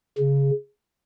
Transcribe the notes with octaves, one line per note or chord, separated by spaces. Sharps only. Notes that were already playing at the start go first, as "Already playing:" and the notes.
C#3